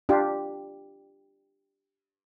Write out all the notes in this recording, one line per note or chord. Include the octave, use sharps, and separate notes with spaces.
D4 F4 G4